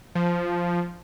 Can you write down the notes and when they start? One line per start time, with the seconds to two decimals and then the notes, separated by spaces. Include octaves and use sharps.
0.15 F3